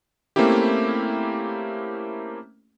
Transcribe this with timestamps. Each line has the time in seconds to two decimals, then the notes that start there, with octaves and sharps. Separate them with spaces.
0.36 A3 A#3 C4 C#4 E4 G4